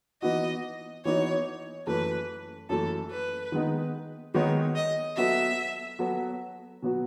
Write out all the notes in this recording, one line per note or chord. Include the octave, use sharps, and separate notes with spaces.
E3 B3 D#4 F#4 D#5
E3 B3 D#4 F#4 C#5
F#2 E3 A3 B4
F#2 E3 A3 A4
B4
D#3 G#3 B3 D#4
D#3 G#3 B3 D#4 C#5
D#5
F#3 B3 F#4 A4 E5
F#3 B3 F#4 A4
B2 F#3 B3 F#4